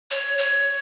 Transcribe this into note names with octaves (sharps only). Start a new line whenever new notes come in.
C#5
C#5